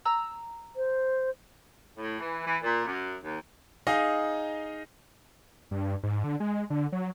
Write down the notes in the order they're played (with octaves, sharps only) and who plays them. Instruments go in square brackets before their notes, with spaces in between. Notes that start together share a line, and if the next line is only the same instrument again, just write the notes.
[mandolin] A#5 E6
[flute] C5
[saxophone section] A2
E3
E3
A#2
F#2
D#2
[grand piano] D#4 G#4 D#5 F5
[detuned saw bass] G2
G#2
D3
G#3
D3
F#3